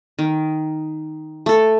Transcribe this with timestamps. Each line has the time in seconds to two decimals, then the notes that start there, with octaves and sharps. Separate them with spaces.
0.19 D#3
1.46 A3 A4